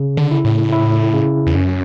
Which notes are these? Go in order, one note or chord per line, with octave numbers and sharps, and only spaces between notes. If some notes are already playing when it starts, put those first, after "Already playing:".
Already playing: C#3
D3
E4
A2
E4
C#3
E2
F#2 C#4